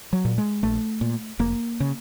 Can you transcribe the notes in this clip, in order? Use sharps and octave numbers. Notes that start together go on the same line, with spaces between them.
F#3
A#2
G#3
A#1 A3
A#2
F1 A#3
C#3